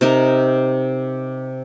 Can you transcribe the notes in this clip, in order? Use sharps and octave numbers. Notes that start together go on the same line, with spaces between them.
C3 D#4 A#4